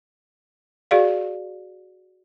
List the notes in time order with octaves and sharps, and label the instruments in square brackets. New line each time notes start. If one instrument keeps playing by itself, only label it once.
[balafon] F#4 G#4 D5 F5